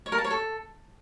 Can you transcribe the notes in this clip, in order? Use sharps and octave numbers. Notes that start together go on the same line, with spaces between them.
C#5
A#4
A5
C#5
A4